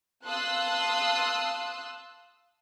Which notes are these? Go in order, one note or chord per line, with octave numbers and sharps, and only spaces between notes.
F5 A5 C6 D#6 E6 F#6